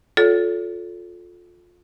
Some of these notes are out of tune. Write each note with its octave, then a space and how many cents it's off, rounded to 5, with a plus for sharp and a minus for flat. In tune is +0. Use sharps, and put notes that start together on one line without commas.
F4 +20 A4 -15 C#5 +40